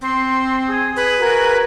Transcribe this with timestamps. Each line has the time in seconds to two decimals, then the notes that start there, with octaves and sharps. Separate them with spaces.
0.01 C4 C6
0.67 G#4 D#6
0.96 B4
1.18 F#4 G#4 A#4